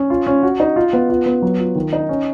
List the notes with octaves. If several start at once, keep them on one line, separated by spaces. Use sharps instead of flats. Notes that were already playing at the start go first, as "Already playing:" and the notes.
Already playing: C#4
F4
C#4
F#4
D#4
F4
B3
F4
B3
F#3
F4
D#3
D#4
C#4